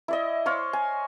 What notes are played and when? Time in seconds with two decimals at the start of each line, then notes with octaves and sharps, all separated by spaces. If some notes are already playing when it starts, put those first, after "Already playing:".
0.08 E4 D5 D#5
0.46 C5 C#5 F5
0.73 G#5